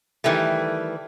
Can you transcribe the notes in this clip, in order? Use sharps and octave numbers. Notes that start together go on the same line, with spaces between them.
D#3 E3 G3 A3